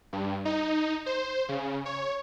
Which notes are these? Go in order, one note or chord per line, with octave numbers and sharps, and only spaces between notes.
G2
D#4
C5
C#3
C#5